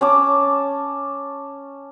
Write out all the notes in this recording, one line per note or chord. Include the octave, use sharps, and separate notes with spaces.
C#4 A5 D6